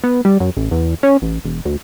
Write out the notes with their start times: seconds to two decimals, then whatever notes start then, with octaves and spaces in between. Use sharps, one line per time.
0.04 B3
0.25 G3
0.40 F#2
0.57 A1
0.71 E2
1.03 C#4
1.22 A1
1.45 E1
1.65 D2